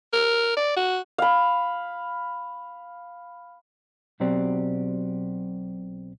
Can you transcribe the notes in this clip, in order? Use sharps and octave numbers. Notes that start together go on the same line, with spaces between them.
A#4
D5
F#4
F5 B5
B1 B2 F#3 C4 G4 D5